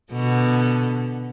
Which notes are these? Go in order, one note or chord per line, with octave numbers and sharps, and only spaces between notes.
B2 D3